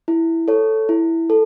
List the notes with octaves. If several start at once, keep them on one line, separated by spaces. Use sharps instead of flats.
E4
A4 C#5
E4
A4